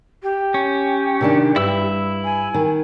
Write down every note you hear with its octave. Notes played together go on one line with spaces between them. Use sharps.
G4
C#4
C3 D#3 D4
G2 E4 E6
G#5
D#3